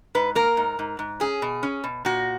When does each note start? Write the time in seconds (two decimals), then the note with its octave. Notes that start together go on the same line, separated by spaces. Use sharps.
0.15 G#2 B4
0.35 A#3 A#4
0.57 G#2
0.79 G#2
0.99 G#2
1.20 C#4 G#4
1.42 B2
1.63 C#4
1.84 B2
2.05 A#2 F#4